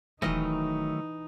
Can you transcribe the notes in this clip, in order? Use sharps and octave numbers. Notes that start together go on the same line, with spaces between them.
D#1 D#3 E3 F#3 A3 D#4 A#4 D#5